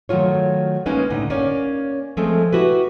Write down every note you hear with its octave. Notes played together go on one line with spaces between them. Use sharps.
D#3 F#3 A3 F4 C#5
G#3 A#3 C#4 D#4 A#4 B4
A2 D3 D#4
A#3 C#4 A#4 C#5 D5
F3 G#3 A3 C4 A4
E4 F#4 G4 B4